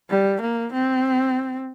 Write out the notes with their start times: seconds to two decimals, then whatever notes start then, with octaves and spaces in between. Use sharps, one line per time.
0.10 G3
0.42 A#3
0.73 C4